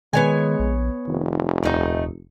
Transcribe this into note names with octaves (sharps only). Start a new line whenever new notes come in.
D#3 G#3 B3 C#5 G#5
A#1
F1 D#3
D#1 A3 D#4